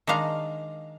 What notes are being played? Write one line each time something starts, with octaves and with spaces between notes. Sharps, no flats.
D#3 G#3 D4 F5 A#5